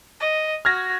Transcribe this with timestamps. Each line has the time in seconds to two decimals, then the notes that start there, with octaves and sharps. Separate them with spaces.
0.21 D#5
0.65 F#4 F6 G#6 A#6